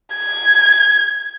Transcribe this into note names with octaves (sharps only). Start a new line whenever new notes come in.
G#6